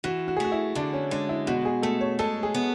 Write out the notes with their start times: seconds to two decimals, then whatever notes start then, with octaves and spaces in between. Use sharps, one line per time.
0.04 E3 F#4
0.28 F#4
0.37 G#4
0.40 A3 F#4
0.52 E4
0.75 D3 D4
0.93 C#4
1.11 G#3 D4
1.29 E4
1.47 B2 F#4
1.65 G#4
1.83 A3 A4
2.01 C#5
2.19 G#3 A4
2.43 G#4
2.54 B3